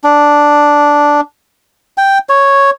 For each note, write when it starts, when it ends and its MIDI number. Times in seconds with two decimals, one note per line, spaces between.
0.04 1.21 62
1.98 2.18 79
2.29 2.70 73